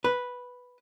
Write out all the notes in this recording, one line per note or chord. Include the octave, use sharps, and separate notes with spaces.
B4